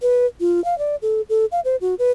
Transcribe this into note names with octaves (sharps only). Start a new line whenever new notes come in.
B4
F4
F5
D5
A4
A4
F5
C5
F#4
B4